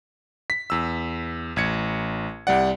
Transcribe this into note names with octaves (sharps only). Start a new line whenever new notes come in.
B6
E2 E6
A1 G#6 C#7
C2 G3 D5 F#5